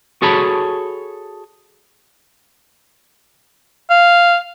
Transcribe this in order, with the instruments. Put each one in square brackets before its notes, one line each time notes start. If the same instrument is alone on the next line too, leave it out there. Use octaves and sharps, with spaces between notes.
[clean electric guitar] F#4 G#4 A4 C#5 A5 B5
[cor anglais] F5